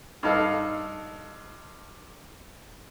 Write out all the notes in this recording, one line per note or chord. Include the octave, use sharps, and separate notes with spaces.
G2 D#4 A4 F5